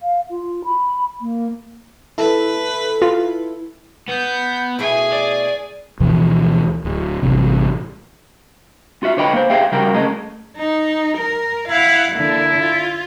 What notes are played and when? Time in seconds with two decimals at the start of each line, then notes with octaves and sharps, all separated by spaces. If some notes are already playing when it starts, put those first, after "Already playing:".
0.01 F5
0.31 F4
0.65 B5
1.21 A#3
2.18 E4 A4 B4
3.02 F4
4.09 B3 G6
4.79 B2 A3 E4 G#4 G#5
5.12 D5
6.00 D2 B2 E3 F3
6.85 D1
7.22 A1 G2 C3
9.03 F4 F#4 E5
9.17 D3 B4 C#5 D#5 G5 B5
9.33 A#3 C5
9.50 G4 G#4 D5 E5 F5 G5
9.72 C#3 G3 C#4 F#4 A#4 G5
9.94 A3 C#4 G#4 A#4 D#5
10.57 D#4
11.18 A#4
11.69 E4 F5 F#5
12.13 D3 A#3 E4
12.57 F4